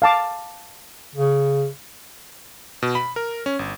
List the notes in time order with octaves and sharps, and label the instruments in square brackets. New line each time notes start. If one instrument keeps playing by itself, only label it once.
[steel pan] F5 A5 D6
[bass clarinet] C#3
[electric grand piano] B2
B5
A#4
C#4
G1